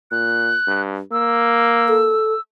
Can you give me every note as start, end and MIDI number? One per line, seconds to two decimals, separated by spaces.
0.11 0.54 46
0.11 0.81 90
0.67 1.00 43
1.12 2.16 58
1.12 2.41 88
1.88 2.34 69